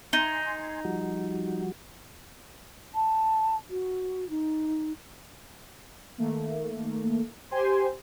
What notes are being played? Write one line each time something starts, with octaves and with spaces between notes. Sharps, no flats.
D#4 G#5 C6
F3 G3 F#4
A5
F#4
D#4
D#3 A3 A#3
G4 C5 G#5 C6